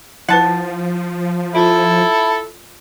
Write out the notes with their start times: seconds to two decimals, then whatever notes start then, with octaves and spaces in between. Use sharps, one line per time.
0.29 F3 E4 B4 F#5 A5
1.55 E4 F4 A4 C5